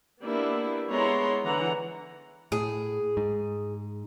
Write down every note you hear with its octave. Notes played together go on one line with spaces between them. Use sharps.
A#3 B3 D4 E4 G4
G#3 B3 E4 C#5 A#5 C6
D3 E3 F#5 A#5
A2 G#4
G#2